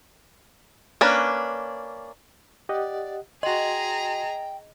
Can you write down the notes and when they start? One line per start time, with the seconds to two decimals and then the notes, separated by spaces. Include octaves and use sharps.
1.01 A#3 C#4 D4 B4
2.69 G4 D5 D#5 F#5
3.43 F#4 G#4 D#5 G5 A#5 C6